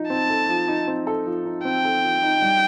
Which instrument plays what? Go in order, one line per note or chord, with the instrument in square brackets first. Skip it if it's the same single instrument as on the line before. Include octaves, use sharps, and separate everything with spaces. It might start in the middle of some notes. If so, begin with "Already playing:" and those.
Already playing: [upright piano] F3 D#4
[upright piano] C4 [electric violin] A5
[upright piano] A4
F3
D#4
C4
A4
F3
D#4
[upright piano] C4 [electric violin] G5
[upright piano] A4
F3
D#4
G3